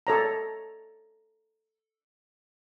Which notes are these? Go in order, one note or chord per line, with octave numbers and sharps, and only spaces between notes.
A4 C#5 A#5